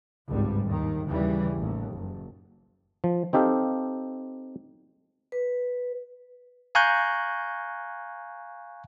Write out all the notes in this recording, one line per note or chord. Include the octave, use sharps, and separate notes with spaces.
G#1 C#2 G2 G3
D#2 D#3
D#2 C#3 E3 G3
A1 D#2
F#1
F3
C4 D#4 G4 A4 F5
B4
F5 G#5 A#5 C#6 F#6 G6